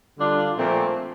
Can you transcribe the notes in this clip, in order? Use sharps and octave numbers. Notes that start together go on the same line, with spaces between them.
D3 G3 D4 F4
A#2 F3 A3 C4